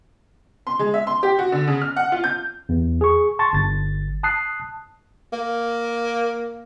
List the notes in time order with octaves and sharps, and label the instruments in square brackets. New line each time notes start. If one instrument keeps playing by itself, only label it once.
[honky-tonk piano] C6
G#3
E5
C6
G4
F#4
D3
C#3
F6
F#5
F4
G6
[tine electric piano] E2
G#4 C#6
A5 C6 C#6 A6
G1 A6
A5 D#6 F#6 C7
[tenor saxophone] A#3